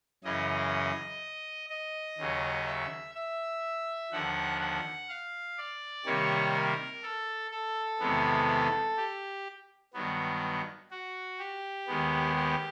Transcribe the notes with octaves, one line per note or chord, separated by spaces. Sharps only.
F#2 C#3 E3 D#5
D#5
D#2 C#3 F#3
E5
E5
D#2 D3 F3 F#5
F#5
F5
D5
C3 D#3 G3 A#3 C#5
A#4
A4
A4
E2 C3 D#3 G#3 B3
G4
G2 D#3 F#3 B3
F#4
G4
D#2 D#3 G#3 B3
G4